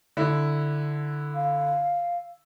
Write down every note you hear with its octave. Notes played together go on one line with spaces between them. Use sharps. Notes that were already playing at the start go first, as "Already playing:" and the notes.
D3 E4
F5